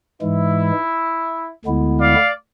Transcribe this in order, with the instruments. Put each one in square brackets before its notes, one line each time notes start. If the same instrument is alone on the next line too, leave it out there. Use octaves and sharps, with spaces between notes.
[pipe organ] G#2 E3 G#3 [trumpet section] E4
[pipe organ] D2 D3 G#3 B3 E4
[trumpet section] D5 F5